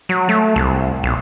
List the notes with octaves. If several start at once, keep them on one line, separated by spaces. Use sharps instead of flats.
F#3
A3
C2
B1